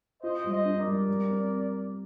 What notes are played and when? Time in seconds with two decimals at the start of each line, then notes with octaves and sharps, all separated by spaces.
0.22 F4 C5 D#5
0.44 G3
0.51 C5 D#5
0.65 D4
0.79 A#4 D5
0.86 G3
1.08 G3
1.30 C4